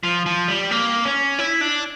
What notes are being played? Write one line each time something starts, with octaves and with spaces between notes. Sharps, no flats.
F3
F3
G3
A#3
C#4
E4
D4